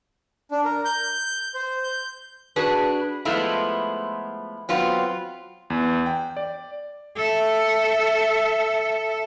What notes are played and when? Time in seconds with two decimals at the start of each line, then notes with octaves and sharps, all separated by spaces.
0.51 D4
0.65 A#4
0.85 G6
1.55 C5
1.84 G6
2.56 D4 F#4 G#4 B4
3.25 F3 G#3 A3 B3 E4 F4
4.69 F#3 B3 C4 F4
5.70 E2
6.06 G5
6.37 D5
7.16 A4 E5